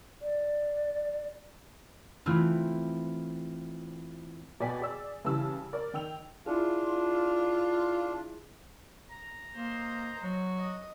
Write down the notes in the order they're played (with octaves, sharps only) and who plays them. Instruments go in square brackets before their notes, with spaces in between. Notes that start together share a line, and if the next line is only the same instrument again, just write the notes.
[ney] D5
[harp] E3 A3 C4 E4 F4
[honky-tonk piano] B2 D5 D#5 G5 G#5 B6
G#4 D5 E6
C#3 E3 G3 A5 E6
A#4 D5
D#3 G5 E6 F7
[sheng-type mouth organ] D4 [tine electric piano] E4 G#4 [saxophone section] F4
[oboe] A#5
[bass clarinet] A#3 [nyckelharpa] C5 D#5
[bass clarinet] F#3 [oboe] F#4
[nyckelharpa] D#5